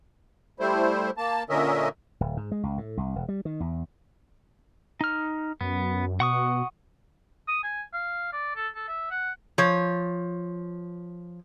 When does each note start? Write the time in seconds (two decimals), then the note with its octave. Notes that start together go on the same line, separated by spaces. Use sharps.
0.60 G3 A3 E4 C5
1.18 A#3 A5
1.50 A#2 D3 C#4 A#4 D#5 E5
2.20 D1
2.37 G#2
2.51 G#3
2.63 C#2
2.78 A2
2.97 C2
3.16 E1
3.29 G3
3.45 D#3
3.60 E2
5.01 D#4 F6
5.61 F#2 B3
6.20 B2 F#5 C#6 D#6
7.48 D#6
7.63 G#5
7.93 F5
8.33 D5
8.56 A4
8.75 A4
8.88 E5
9.11 F#5
9.58 F3 C#5